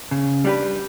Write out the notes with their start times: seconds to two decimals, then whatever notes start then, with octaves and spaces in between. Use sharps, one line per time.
0.11 C#3
0.45 G3 D4 G4 B4